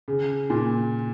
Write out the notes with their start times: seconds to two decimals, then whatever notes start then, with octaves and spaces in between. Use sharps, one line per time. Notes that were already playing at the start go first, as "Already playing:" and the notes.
0.08 C#3
0.50 A#2